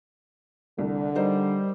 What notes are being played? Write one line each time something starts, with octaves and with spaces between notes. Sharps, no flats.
C2 D3
G3 D#4 A#4 C5